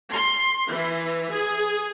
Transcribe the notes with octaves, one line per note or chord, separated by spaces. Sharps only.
C6
E3
G#4